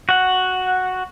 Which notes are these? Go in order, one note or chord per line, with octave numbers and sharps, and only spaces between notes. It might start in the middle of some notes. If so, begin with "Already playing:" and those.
F#4 F#5